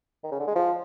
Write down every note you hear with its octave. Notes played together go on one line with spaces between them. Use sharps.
D#3
C#3
D3
G#3
F3